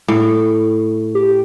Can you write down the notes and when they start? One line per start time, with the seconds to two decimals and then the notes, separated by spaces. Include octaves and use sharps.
0.08 A2
1.15 G4